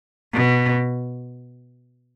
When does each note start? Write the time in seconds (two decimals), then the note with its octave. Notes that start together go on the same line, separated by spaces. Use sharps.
0.34 B2